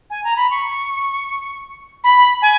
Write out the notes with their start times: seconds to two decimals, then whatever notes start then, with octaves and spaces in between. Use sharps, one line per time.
0.10 G#5
0.24 A#5
0.36 B5
0.51 C#6
2.04 B5
2.42 G#5